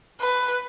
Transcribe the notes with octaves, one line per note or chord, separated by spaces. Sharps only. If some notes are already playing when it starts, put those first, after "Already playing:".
B4